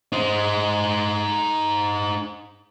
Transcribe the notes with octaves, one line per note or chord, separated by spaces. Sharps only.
D#4 C5